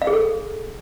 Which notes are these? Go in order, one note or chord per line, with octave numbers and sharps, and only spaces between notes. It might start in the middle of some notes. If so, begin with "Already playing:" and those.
F5
G#4
A4